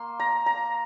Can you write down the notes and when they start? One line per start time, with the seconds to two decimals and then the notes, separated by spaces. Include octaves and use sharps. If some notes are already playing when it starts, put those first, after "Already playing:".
Already playing: A#3 C6
0.20 A#5
0.46 A#5